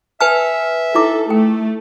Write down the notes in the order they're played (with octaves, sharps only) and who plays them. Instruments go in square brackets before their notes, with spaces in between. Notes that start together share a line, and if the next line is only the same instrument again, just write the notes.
[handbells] B4 G#5 F6 [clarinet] E5 [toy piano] A5
[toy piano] D#4 E4 D6 [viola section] A4
[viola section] A3 [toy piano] G5